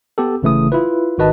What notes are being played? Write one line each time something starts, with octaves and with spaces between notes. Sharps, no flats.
B3 G4 A4
G1 C#3 E3 A3 E4 D#6
E4 F4 B4
G#1 D#3 F#4 B4 D#5 A5